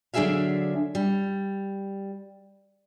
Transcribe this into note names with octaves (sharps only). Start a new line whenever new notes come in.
D3 F#3 D4 G#4 E5 F5
G3